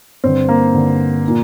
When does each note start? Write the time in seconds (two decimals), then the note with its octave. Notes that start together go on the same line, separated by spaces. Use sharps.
0.24 G2 D3 C4
0.49 A#3
0.73 G2 D3
1.28 A#2